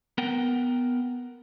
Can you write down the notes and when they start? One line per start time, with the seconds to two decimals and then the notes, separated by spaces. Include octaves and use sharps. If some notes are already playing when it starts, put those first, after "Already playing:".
0.18 B3 A#4 F#5 G5